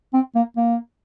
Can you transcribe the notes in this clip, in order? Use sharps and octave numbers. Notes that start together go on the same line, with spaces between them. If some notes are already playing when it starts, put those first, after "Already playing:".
C4
A#3
A#3